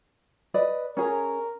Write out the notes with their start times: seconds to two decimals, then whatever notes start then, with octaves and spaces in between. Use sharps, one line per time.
0.54 B4 D5 D#5
0.97 C#4 G#4 A#4